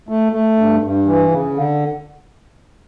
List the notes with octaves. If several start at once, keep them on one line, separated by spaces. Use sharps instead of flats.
A3
A3
G2
G2
E3
C#3
D3